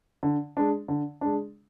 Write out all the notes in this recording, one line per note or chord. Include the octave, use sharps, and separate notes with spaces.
D3
G#3 D4
D3
G#3 D4